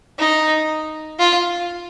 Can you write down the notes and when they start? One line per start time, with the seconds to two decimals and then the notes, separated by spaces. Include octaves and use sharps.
0.19 D#4
1.19 F4